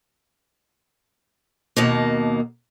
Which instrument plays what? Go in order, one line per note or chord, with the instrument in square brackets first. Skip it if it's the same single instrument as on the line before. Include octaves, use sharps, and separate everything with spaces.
[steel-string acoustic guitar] D#2 B2 A#3